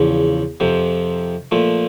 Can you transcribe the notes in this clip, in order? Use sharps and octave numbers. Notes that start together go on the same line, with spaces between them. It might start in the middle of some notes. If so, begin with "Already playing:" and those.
Already playing: E2 C#3 F3
F2 C3 F3
A#2 F3 A3